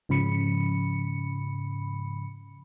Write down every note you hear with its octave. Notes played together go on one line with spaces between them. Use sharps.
G#2 C#3 F3 B5 C#7